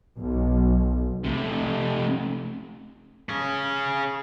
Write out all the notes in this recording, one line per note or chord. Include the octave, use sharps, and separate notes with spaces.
B1
C3 A3
C#4 G#4